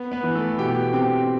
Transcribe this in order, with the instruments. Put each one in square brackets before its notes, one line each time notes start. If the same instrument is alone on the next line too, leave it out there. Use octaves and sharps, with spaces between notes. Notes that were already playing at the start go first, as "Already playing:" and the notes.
Already playing: [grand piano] B3
B3 B4
E3
A3 A4
B2 G4 G5
C4 G4 G5